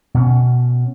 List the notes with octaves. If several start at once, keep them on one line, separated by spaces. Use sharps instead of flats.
B2 C#4